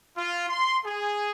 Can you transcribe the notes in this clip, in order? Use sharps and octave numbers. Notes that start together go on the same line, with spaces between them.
F4
C6
G#4